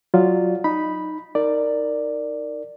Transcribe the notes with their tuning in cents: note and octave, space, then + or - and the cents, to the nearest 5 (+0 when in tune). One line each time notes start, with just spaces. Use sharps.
F#3 +0 F4 +0 D5 +5
D#4 +0 B5 -5
D#4 +0 A#4 -20 D5 +5